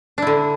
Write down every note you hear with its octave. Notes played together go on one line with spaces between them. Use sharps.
D3 D4 E4